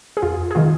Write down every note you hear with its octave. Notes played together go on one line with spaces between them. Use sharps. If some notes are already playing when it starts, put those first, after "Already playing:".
G#4
F2 F4
G#4
C3 D#3 F4